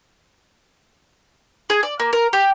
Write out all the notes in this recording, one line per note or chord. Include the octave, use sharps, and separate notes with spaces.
G#4
D5
A#3
A#4
G4